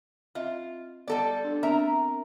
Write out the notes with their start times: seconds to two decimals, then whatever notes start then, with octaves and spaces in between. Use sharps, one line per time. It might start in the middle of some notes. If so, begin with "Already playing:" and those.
0.35 C4 F4 D#5 E5
1.08 G3 B3 A4 D5 D#5 F#5
1.44 D4
1.63 B3 C4 D4 A#4 E5 A#5